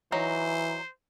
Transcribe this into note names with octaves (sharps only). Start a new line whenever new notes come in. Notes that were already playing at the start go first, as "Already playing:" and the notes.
E3 F#3 D#4 C5